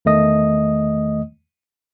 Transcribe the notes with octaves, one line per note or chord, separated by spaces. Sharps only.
E2 D#3 A3 D#5 D#6